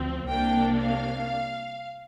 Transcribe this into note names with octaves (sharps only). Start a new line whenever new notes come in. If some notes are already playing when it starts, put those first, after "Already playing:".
Already playing: D2 F3 C4
C2 C3 A#3 D4 G5
F5